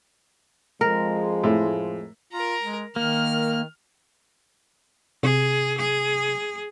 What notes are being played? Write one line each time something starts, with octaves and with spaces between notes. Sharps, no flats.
F2 F3 G#3 A#4
A2
F4 A#4 A#5
G#3
D#3 A#3 F6
C3 G#4
G#4